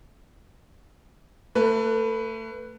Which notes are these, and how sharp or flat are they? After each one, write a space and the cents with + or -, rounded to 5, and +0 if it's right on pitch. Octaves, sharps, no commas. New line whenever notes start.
A3 +30 B4 +0